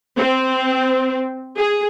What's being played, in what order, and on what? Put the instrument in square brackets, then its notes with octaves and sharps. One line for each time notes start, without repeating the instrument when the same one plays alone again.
[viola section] C4
G#4